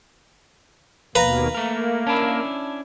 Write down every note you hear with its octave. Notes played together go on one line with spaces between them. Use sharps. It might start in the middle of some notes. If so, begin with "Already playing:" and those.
D#2 B2 A#3 B4 F5 A#5 A#6
A3 A#3 A#4
C#4 D4 E4 A5 B5